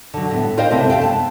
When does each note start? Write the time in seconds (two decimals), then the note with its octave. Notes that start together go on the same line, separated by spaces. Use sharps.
0.14 D3 F#3
0.31 A2 B3
0.57 F4 A#4 C5 D#5 F5 G5
0.70 C3 A3 C4 D4 E4
0.90 A3 F5 G5
1.01 B3 A5